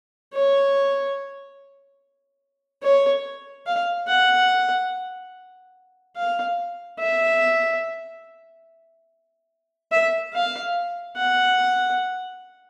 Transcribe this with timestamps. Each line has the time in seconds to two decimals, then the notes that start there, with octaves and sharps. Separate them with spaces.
0.33 C#5
2.83 C#5
3.66 F5
4.08 F#5
6.16 F5
6.99 E5
9.92 E5
10.33 F5
11.17 F#5